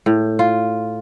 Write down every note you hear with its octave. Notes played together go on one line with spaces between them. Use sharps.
A2
F4